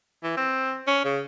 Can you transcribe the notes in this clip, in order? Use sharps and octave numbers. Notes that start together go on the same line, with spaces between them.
E3
C4
C#4
C#3